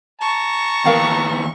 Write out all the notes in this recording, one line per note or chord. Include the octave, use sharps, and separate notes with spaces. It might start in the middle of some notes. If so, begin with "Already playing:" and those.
A5 A#5 C#6
D#2 B3 A#4 F5 G5